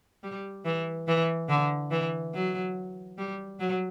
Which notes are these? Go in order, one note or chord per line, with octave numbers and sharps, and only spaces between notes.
G3
E3
E3
D3
E3
F#3
G3
F#3